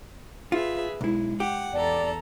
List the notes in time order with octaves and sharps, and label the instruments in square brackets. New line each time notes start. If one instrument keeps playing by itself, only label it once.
[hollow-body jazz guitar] F4 [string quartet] G#4 B4 E5
[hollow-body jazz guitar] B1 E4 [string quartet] G#3
[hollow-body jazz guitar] G4 [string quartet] F#5
[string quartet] E2 A4 A#5 [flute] D5